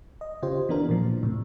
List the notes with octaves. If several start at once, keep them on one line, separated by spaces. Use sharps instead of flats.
D#5
C#3 F4 G4 C5
E3 B3 D4 A#4
A#2 F3
A2 C3